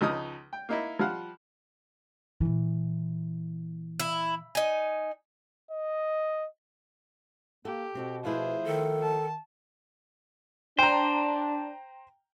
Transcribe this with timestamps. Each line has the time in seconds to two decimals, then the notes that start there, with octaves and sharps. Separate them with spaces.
0.01 C#2 F3 D#4 B4 D#6
0.53 G5
0.69 A#3 D#4 E4
0.99 F3 G3 F5 F#5
2.41 A#2 E3
4.00 E4
4.55 D#4 G#5
5.71 D#5
7.65 A#3 G4 A4
7.95 B2 C4 F#4 A4
8.25 F3 A3 E4 G#4 B4 C5
8.64 D#3 A4
9.02 A5
10.79 D4 C5 G5 A#5